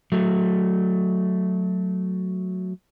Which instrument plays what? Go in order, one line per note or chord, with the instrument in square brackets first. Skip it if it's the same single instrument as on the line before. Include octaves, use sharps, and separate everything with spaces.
[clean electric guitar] F#3 A3